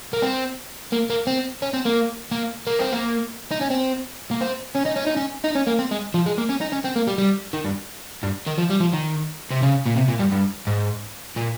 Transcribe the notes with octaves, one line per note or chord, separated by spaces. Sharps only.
A#3
C4
A#3
A#3
C4
C#4
C4
A#3
A#3
A#3
C4
A#3
D#4
C#4
C4
A#3
C4
C#4
D#4
C#4
D#4
C#4
D#4
C#4
A#3
C4
G#3
F3
G#3
A#3
C#4
D#4
C#4
C4
A#3
G3
G3
D#3
G2
G2
D#3
F3
G3
F3
D#3
C3
C#3
A#2
C3
A#2
G2
G2
G#2
A#2